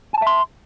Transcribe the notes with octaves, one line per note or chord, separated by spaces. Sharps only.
E5 G#5 A5 C6